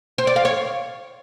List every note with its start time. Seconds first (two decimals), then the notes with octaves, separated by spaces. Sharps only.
0.18 C5
0.27 D5
0.36 F5
0.45 C#5